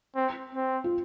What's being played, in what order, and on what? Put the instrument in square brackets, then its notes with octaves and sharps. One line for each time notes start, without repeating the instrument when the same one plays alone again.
[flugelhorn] C4
C4
[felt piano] F4